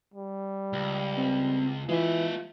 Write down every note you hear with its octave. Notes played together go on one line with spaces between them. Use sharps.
G3
C#2
C4
E3 G#3 F4 E5